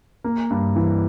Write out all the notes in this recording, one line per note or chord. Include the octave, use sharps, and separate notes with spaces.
A#3
G2
E3